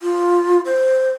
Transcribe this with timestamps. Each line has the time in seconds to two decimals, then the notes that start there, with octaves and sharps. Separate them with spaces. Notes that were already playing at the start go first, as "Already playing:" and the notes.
0.02 F4
0.65 C5